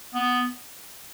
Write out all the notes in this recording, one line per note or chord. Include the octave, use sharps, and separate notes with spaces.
B3